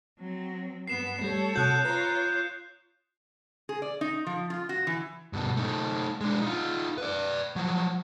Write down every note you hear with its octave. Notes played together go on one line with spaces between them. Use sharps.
F#3 C4
G2 B3 C7 E7
G3 A3 A4 C#5
C3 F#4 D#6 F#6 G6
F4 B4 C#5 A#5
G#4
D5
D#4
F3
F4
F#4
E3
G2 B2
A3 D#4
G#3 D4
D#4 F4
B4 D5
F3 F#3